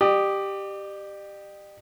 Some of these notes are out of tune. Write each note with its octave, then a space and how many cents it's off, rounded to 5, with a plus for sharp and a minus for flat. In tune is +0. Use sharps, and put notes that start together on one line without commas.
G4 +0 D5 +45 D#6 -5